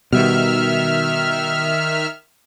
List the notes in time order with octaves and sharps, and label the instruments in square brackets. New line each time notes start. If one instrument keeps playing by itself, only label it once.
[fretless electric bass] B2 G3 [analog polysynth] D#3 E5 F6